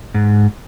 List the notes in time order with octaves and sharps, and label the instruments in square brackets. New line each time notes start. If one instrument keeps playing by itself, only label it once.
[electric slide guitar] G#2